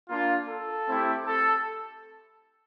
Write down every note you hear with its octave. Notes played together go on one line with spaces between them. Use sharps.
A#3 D4 F4
A4
A3 C4 E4 G4
A4